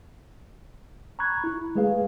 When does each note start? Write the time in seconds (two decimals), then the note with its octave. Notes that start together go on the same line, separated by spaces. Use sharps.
1.19 A#5 B5 C#6 F#6 G#6
1.44 E4
1.75 G#3 A3 G#4 B4 F5